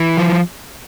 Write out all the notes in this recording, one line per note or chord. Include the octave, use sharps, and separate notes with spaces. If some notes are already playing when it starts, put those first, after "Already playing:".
Already playing: E3
F3